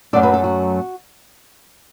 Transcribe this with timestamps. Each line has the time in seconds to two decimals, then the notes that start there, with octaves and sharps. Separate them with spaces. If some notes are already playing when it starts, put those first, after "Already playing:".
0.13 F#2 F#3 A3 A4 D5
0.23 F#4 B4
0.34 A4
0.44 F#4